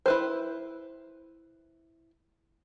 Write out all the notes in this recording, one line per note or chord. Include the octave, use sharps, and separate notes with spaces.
E4 B4 C5